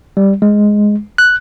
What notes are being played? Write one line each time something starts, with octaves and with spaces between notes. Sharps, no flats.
G3
G#3
F#6